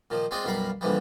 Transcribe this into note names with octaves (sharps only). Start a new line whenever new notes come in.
A#2 D#3 F3
G#3 C4 F4 D5 D#5
B1 F#2 G3 F5 A#5 B5
A#1 D3 E3 F3 G3